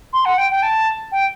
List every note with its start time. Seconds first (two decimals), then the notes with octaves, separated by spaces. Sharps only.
0.13 C6
0.25 F#5
0.38 G5
0.50 G5
0.62 A5
1.12 G5